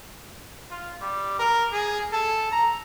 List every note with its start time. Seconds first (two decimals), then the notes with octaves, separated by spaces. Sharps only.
0.71 F4
1.01 G3
1.39 A#4
1.72 G#4
2.13 A4
2.52 A#5